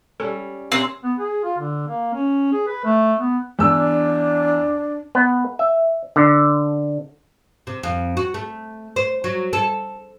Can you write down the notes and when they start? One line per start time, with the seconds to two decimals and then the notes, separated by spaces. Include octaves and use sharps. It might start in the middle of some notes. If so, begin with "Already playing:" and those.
0.20 G3 C#4 A4
0.72 C3 A#3 C4 C#4
1.04 B3
1.19 G#4
1.44 F4
1.58 D3
1.88 A#3
2.13 C#4
2.52 G#4
2.67 B4
2.85 A3
3.19 B3
3.59 E2 D4 E6
5.15 B3
5.59 E5
6.16 D3
7.67 C3
7.83 F2
8.17 F#4
8.34 A3
8.96 C5
9.24 F#3
9.53 A4